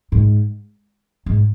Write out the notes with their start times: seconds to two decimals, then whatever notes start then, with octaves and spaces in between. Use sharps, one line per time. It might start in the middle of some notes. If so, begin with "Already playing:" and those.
0.12 G#2
1.26 G#2